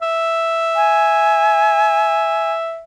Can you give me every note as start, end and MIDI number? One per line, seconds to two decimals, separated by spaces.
0.02 2.83 76
0.76 2.52 80